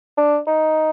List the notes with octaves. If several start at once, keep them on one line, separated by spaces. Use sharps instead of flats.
D4
D#4